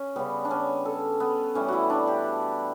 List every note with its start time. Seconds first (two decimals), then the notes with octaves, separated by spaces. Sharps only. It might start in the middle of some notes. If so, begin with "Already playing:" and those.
Already playing: C#4
0.16 C#3 G3 B3
0.45 D4
0.51 C#4
0.85 A4
1.20 B3
1.55 A2 E3 G3 C#4
1.68 E4 F#4
1.90 D4
2.07 G4